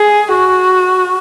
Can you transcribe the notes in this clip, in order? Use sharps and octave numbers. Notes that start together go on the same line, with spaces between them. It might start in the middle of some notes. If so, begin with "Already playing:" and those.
Already playing: G#4
F#4